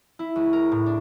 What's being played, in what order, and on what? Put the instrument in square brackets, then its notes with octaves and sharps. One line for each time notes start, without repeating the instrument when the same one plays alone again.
[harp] E4
C#2
A#4
A2
D4